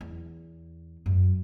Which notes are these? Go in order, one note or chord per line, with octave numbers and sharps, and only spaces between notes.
E2
F#2